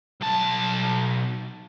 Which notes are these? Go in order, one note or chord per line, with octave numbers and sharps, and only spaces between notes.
B1 A5